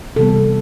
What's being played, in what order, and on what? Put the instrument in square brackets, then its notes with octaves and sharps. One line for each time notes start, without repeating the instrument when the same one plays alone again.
[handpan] C3 E3 G3 B3 A4